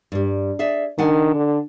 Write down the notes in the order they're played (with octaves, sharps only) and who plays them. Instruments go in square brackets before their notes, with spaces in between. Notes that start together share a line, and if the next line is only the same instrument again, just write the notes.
[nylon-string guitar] G2 G3
G#4 D5 E5
[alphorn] D#3 [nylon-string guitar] D4 F#5 G#5
[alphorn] D3